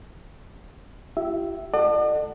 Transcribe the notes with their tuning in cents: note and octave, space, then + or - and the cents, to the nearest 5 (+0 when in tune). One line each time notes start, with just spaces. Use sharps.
E4 +45 G4 -25 E5 +0
A4 +10 D5 +45 F#5 +0